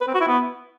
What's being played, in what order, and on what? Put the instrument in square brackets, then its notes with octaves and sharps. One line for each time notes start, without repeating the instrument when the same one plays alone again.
[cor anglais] B4
C4
F#4
E4
B3